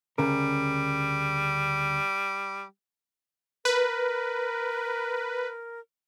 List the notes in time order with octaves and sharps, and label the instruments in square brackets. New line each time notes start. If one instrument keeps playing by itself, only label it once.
[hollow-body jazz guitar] D2 C#3 A#4 [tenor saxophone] G3
[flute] A#4 [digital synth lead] B4